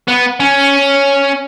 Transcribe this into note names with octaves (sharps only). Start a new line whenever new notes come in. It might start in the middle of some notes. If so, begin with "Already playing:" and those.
B3
C#4